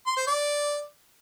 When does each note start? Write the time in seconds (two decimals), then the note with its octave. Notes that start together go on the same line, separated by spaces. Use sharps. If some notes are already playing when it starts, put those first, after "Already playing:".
0.07 C6
0.17 C5
0.27 D5